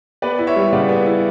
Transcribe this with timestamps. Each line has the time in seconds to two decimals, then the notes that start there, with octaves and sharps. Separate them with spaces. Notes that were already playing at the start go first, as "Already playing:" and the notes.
0.22 B3 B4 D5
0.39 E4
0.47 C#5 E5
0.56 G3
0.72 C#3 D5 F#5
0.89 B3
1.06 E4